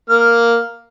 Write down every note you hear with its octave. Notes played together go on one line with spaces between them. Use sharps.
A#3 F6